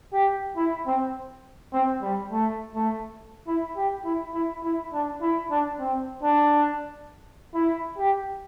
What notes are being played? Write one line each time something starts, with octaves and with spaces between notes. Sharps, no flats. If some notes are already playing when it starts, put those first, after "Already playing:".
G4
E4
C4
C4
G3
A3
A3
E4
G4
E4
E4
E4
D4
E4
D4
C4
D4
E4
G4